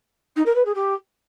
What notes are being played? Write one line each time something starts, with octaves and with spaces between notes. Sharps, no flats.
D#4
A#4
B4
G#4
G4